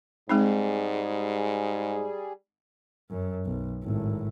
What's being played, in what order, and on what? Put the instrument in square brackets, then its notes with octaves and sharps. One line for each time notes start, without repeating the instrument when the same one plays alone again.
[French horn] G#2 [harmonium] G3 G#4 [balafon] G#3 C4 D#4
[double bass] F#2
B1
G#1 A2